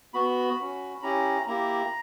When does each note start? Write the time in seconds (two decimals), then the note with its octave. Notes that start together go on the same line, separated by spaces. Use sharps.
0.14 B3 F#4 B5
0.59 C#4 F#4
1.02 C#4 E4 G4 A#5
1.46 A#3 E4 G4 A#5